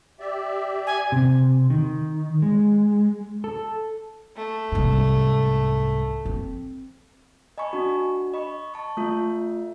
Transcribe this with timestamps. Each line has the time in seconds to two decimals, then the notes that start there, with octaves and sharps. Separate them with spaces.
0.19 G4 D5 E5
0.87 G#5
1.12 C3
1.70 D#3
2.42 G#3
3.44 A4
4.36 A3
4.72 C2 G#2
6.25 C4
7.58 D#5 G#5 A5 B5 C#6
7.73 D4 F#4
8.34 D#5 B5 C#6
8.74 A5 C#6
8.97 A3 F4 E5